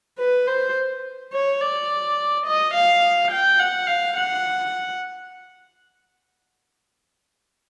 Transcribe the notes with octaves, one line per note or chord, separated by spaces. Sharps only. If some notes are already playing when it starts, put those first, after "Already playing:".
B4
C5
C#5
D5
D#5
F5
G5
F#5
F5
F#5